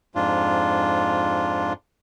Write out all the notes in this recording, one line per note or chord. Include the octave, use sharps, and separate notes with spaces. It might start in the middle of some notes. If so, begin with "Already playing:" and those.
F2 G#2 D4 F4